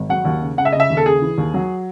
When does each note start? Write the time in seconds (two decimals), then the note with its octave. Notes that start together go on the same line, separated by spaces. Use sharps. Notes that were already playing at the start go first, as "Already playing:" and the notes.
Already playing: G#1
0.09 F#3 F#5
0.25 D#2
0.41 C#3
0.57 C#3 F#5
0.65 E5
0.73 C#3 D#5
0.80 E5
0.90 D#2
0.97 A4
1.06 C#3 G#4
1.22 E3
1.38 D#2
1.54 F#3